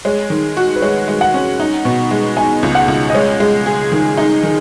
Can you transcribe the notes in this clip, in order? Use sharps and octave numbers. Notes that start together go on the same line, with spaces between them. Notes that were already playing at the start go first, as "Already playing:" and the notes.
G#3 C#5
D#3
F#4
B4
G#3 C#5
G#3
F#5
C#4
D#4
B2
G#3
D#4 G#5
C#2
F#5
C#2
D#5
G#3 C#5
G#3
G#4
D#3
D#4
D#3